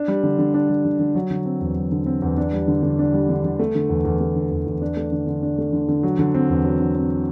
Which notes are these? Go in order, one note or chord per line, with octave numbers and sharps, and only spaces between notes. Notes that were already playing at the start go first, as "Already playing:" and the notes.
Already playing: D4
G3
D3
D3
D4
G3
D3
D3
F#3
D3
C4
E2
F#3
D3
C4
E2
D4
G3
D3
D3
D4
G3
D3
D3
A3
D3
E2
E2
A3
D3
E2
E2
D4
A3
D3
D3
D4
A3
D3
D3
F#3
D3
C4
E2
F#3
D3
C4